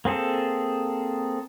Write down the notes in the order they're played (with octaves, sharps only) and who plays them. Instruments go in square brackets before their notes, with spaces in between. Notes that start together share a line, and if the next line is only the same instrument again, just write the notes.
[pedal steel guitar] A#3 C4 G#4 A4